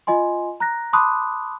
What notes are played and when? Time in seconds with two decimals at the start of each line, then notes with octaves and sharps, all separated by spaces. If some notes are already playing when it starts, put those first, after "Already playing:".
0.07 F4 D#5 G#5 C6
0.60 A#5 F#6 A#6
0.93 A5 B5 C6 D6 D#6 F#6